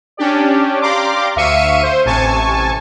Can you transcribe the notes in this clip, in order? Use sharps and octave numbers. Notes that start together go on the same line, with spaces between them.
C#4 D4 G4 D5
G4 D5 F5 A#5 C6 D6
D2 E5 F5 C#6 C#7 D#7
C5
A1 C3 G#5 A5 C#6